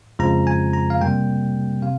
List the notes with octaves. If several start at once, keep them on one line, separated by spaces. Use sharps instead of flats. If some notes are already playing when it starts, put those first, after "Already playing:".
F2 C#3 F3 G#3 A#5
G#5
A#5
F5
C3 G3 A#3 G5
C3 F5